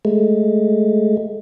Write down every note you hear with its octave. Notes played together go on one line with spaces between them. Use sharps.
G#3 A3